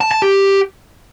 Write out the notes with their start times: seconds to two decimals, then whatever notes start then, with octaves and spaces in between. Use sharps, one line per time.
0.01 A5
0.11 A5
0.22 G4